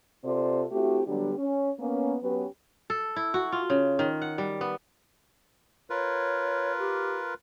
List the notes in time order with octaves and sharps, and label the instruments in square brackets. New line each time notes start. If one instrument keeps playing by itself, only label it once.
[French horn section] C3 C4 F4 A4 C5 D5
A3 C4 E4 F#4 G4
D3 F#3 G3 B3 D4 G4
C#4
A#3 B3 C#4
F#3 B3 C#4 G4 B4
[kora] A4
E4
F#4
F4
C#3
D#3
F#5
G3
B3
[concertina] F4 A#4 B4 [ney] C#5
[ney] G4